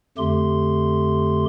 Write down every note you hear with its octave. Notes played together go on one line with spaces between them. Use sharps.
F2 D3 A3 G4 C6